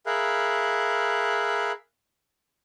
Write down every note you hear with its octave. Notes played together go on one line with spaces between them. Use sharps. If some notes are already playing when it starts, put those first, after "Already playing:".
G#4 A#4 E5 F5 B5 F#6